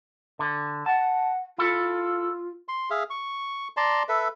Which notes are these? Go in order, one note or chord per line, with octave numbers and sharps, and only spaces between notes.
D3
F#5 A5
E4 F4 A4
C6
G#4 E5 F5
C#6
D5 A5 A#5 C6
A4 B4 E5